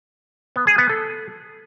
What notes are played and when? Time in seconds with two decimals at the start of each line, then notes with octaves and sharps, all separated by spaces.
0.56 B3
0.67 G#4
0.78 B3
0.89 A4